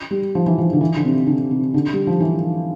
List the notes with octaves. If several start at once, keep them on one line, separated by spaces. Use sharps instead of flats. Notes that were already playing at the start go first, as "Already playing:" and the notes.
G3
F3
E3
F3
D3
E3
D3
C3
D3
C3
D3
G3
F3
E3